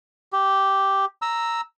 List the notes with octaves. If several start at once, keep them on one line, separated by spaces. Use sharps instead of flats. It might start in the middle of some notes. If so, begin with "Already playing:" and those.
G4
A#5 E6